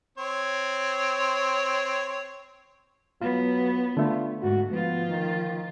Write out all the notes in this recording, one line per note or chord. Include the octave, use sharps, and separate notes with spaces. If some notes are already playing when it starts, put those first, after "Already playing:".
C4 C#5
F#3 B3 F4
D3 A3 F4
G#2 F#4
F3 B3 F4
D#3